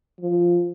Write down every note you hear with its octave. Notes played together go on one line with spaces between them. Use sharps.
F3